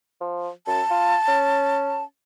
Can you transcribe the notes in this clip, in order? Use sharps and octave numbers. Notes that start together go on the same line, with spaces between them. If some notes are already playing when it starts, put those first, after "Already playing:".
F3
F#2 A5
F4
C#4